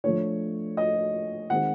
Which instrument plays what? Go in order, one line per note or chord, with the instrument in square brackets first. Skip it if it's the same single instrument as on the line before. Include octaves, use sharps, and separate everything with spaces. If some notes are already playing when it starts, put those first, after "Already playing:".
[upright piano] F3 A3 D4 C#5
D#5
D#3 G#3 C4 F#5